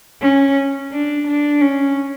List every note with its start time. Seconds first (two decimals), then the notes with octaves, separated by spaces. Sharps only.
0.21 C#4
0.92 D4
1.27 D4
1.61 C#4